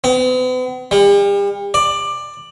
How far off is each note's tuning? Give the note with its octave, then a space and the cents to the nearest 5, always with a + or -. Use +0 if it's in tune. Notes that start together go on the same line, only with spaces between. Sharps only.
B3 +45
G3 +40
D5 +15